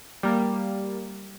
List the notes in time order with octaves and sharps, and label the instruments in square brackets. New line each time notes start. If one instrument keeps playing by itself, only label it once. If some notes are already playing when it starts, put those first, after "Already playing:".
[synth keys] G3 A#3